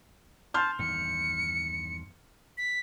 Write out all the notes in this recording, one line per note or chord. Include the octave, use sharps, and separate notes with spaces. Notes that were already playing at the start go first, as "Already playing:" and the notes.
A5 C6 F6 G6
E2 G2 D#3 C#7
B6